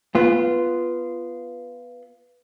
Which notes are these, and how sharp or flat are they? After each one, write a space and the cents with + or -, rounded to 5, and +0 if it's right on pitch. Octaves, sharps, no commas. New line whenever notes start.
B3 +0 F4 -15